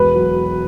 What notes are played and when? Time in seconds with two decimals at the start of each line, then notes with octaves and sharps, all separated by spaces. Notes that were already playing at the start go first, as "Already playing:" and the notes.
Already playing: E1 B4
0.15 F#3